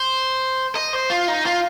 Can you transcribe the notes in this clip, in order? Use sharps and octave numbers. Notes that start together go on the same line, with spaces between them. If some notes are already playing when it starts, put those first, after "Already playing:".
Already playing: C5
D#5
C5
F4
D#4
F4